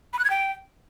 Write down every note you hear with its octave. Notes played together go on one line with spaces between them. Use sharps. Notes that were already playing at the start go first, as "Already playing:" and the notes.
B5
F#6
G#6
G5